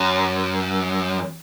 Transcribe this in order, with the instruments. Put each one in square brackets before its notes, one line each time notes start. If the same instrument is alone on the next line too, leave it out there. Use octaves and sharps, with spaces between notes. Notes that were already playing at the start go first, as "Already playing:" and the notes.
Already playing: [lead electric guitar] F#2